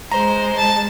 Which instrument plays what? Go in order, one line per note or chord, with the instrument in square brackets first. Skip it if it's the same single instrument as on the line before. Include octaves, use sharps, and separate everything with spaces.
[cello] G#3 [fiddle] C5 [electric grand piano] A#5
[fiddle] A5